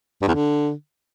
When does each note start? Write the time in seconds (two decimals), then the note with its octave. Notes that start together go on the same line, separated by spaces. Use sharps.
0.22 G2
0.28 E2
0.35 D3